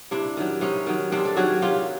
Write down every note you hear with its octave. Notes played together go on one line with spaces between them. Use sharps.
C3 D4 E4
D#3 F#3
C3 C#4 D#4
D#3 F#3
C3 C4 D4
A4
D#3 F#3 F#4 G#4
C3 F4 G4